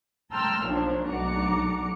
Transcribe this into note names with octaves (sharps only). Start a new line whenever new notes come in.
G5 A5 A#5 C6 E6 F6
B1 A#2 F3 D4 C#5
B1 D4 F#4 A#5 D6 C#7